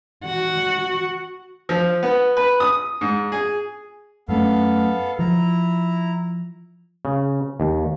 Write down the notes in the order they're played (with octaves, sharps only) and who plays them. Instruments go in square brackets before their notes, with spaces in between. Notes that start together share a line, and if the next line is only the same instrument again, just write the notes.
[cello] F#4 F#5
[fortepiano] F3
B3
B4
D#6
G#2
G#4
[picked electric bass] F#2 A3 C#4 [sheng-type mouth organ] B3 A4 F5
[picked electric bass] F3 [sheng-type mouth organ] E4 A#5
[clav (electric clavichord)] C#3
D#2